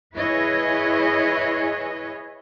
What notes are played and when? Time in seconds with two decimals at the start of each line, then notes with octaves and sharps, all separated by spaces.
0.16 E4 G#4 B4 C#5 D#5